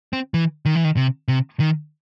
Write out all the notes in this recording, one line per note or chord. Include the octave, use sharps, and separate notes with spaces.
C4
E3
D#3
E3
D#3
C3
C3
D#3